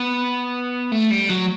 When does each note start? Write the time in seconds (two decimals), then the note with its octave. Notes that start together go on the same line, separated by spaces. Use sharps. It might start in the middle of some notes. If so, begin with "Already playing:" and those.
Already playing: B3
0.92 A3
1.11 G3
1.30 F#3